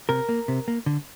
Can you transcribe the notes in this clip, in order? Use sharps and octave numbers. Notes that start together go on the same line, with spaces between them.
C3 A#4
A#3
C3
A#3
D3